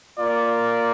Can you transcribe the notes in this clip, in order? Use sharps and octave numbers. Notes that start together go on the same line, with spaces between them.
A#3 F4 D5